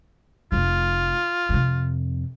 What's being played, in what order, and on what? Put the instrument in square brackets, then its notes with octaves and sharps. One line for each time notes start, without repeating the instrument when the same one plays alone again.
[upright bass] F1 A3 [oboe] F4
[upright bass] F2 C3